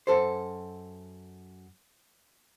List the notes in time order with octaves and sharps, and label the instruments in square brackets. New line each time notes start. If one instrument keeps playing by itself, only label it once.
[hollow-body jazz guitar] F#2 A4 C5